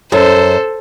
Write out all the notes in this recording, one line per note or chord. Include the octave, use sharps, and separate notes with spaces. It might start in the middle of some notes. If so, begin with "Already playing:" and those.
F#2 A4 C5